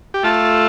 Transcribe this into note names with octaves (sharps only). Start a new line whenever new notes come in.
G4
A3 F4 A4